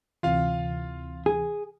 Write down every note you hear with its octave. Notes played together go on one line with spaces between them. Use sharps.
D2 C3 E3 F4 F5
G#4